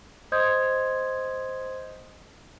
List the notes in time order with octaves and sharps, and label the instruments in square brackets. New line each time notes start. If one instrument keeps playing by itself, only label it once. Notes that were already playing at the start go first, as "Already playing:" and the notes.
[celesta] C5 D#5 C6 D#6 G6 G#6